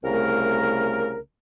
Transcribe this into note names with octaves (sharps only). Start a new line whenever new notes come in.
C2 C#3 A3 A#4